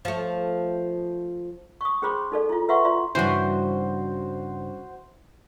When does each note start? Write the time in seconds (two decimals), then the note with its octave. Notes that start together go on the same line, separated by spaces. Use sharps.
0.05 F3 A3
1.81 C#6 D#6
2.02 C#4 G#4 C5 B5 C6 D6
2.32 D#4 A4 D5
2.49 E4 F4
2.69 B4 E5 F#5 C6 C#6
2.84 F4 D5 C6
3.15 G2 C#3 E3 F#4 C5